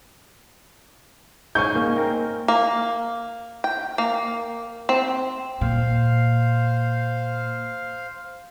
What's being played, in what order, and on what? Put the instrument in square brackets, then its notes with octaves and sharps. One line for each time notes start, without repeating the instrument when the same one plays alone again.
[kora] G#2 C#4 [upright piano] G#5 C#6 G6
[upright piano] A#3
[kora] C4 A#4
[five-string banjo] A#3
G5
A#3
C4
[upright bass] A#2 [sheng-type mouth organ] C5 F5